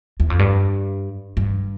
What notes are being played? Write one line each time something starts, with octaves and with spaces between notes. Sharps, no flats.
E2
F2
G2
G2